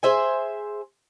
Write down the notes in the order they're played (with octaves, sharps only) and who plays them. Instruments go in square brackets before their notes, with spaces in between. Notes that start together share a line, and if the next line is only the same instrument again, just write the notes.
[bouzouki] G#4 C5 E5 G#5